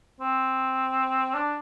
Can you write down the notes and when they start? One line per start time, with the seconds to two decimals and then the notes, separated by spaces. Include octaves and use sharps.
0.20 C4
1.34 D4